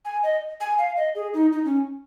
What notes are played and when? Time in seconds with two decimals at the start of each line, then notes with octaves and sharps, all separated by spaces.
0.05 G#5
0.23 D#5
0.61 G#5
0.78 F5
0.97 D#5
1.15 G#4
1.34 D#4
1.52 D#4
1.65 C#4